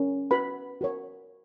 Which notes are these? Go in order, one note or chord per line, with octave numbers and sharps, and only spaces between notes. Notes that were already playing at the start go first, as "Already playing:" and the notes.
Already playing: C#4 A#4
F#4 B4 B5
F#4 A#4 C#5